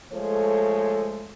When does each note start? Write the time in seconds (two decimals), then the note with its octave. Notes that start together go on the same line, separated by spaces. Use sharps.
0.12 F3 G#3 A3 A4 C5 C#5